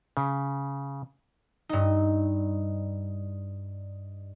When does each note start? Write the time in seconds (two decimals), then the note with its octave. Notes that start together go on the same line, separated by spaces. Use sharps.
0.17 C#3
1.69 G2 D#4